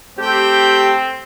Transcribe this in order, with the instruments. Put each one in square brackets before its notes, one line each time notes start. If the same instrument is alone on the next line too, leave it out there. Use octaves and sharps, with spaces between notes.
[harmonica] A3 G5 [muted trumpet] C4 [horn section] G4